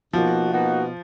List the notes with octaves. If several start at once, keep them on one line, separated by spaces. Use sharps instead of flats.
B2 F3 A#3 D#4 F#4
B2 A#3 D#4 F#4